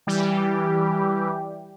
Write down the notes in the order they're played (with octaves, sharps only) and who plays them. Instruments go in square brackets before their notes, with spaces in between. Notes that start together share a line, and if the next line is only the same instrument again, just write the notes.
[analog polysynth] E3 G3 G4